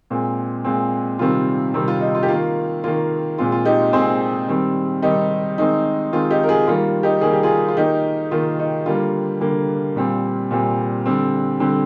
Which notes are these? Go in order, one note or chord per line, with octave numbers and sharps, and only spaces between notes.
A#2 G#3 C4
A#2 G#3 C4
C3 D#3 G3 C4 F4
C3 D#3 G3 C4
F4
D#4
F4
G4
D#3 A#3 F4
D#3 A#3 F4
A#2 G#3 C4 F4
F4
D#4 G4
A#2 G#3 C4 G#4 C5
D#3 G3 C4
D#3 G3 C4 D#4 G4
D#3 G#3 C4 D#4
D#3 G#3 C4 F4
D#4 G4
A#4
F4 G#4
D#3 G3 A#3 F4
D#4 G4
D#3 G3 A#3 G#4
G4
F4 G#4
F4
D#3 A#3 D#4 G4
D#3 A#3 F4
D#4
D3 G3 A#3 F4
D3 G3 A#3
A#2 G3 C4
A#2 G3 C4
D3 G3 C4
D3 G3 C4